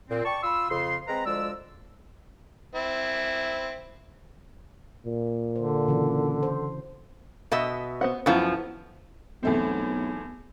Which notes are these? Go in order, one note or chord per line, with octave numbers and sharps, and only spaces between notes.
A#2 C4
D5 G5 A5 C#6
F4 B5 C6 E6
F2 C#3 C6
G#3 C4 B4 A#5
D2 F3 G#3 D5 E6
C4 E4
A#2
D3 C5
C#3 E3 F#4
C5
B2 D#5 E5
B3 C5 F#5
F#2 F3 B3 E4 A4
B1 E2 A3 C4